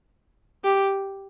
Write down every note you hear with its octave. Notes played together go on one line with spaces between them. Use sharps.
G4